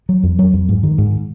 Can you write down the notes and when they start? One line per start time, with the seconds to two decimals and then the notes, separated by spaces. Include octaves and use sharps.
0.09 F#3
0.23 F2
0.39 F#3
0.53 F2
0.69 G#2
0.83 D#3
0.98 G#2